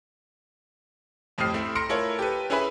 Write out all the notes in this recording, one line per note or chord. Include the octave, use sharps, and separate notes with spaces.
F2 A2 G4 D#6 F6 C7
A3 C4 E4
A#5 C6 F6 A#6 C#7 D7
A3 E4 F4 A4 A#4 C#5
G4 A4 B4
C#4 E4 G#4 B4 E5 B5